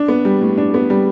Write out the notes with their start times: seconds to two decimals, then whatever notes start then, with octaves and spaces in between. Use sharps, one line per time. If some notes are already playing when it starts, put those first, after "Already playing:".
Already playing: D4
0.08 B3
0.25 G3
0.41 A2
0.58 D4
0.74 B3
0.90 G3